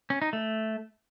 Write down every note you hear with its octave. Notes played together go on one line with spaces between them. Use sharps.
C#4
D#4
A3